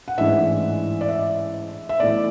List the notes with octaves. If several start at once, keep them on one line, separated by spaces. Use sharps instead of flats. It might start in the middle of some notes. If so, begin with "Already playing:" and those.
F#5
A1 G#2 E3 G#3 D4 E5
D5
E5
E5
B1 A2 E3 D5